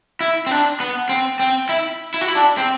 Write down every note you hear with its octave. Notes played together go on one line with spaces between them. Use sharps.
E4
C4
D4
B3
C4
C4
E4
E4
F#4
E4
D4
C4